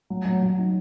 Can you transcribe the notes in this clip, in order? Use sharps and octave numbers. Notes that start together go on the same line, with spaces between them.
F#3
F#3
F#3
D#4